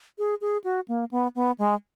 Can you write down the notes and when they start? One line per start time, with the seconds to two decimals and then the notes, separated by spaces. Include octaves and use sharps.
0.18 G#4
0.41 G#4
0.64 F#4
0.88 A#3
1.11 B3
1.35 B3
1.58 G#3